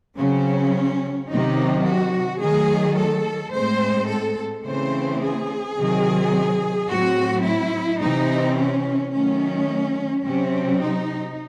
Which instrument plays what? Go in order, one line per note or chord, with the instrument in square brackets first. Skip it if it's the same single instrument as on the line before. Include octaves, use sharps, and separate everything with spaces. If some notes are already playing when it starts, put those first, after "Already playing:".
[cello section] C#3 F#3 C4 C#4
C3 D#3 F#3 D#4
F#4
D#3 F#3 A3 G#4
A4
A2 G#3 C4 C5
A4
C#3 E3 A3 C4 C5
G#4
C3 D#3 F#3 C4
A2 F#3 C4 F#4
E4
C3 E3 C4 D#4
C#4
D#3 F#3 A3 C#4
C3 F#3 C4 C#4
D#4